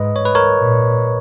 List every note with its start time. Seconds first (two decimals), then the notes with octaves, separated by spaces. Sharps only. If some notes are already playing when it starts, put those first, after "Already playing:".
Already playing: G#2 B4 D#5
0.16 C#5
0.25 B4
0.35 A#4 C#5
0.59 A#2